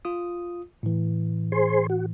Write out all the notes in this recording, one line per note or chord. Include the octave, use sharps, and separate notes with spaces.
F4 D#6
A2 E3
G#4 C5 C6
F#4